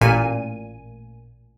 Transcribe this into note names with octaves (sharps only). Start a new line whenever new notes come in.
A1 A#2 G#5 D#7